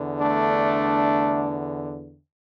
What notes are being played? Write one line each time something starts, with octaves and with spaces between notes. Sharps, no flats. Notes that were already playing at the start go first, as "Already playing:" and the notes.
Already playing: E2 D3
A3 D4